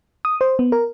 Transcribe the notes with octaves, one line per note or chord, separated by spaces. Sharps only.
D#6
C5
B3
A#4